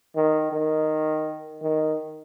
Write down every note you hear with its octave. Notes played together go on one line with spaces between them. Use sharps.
D#3
D#3
D#3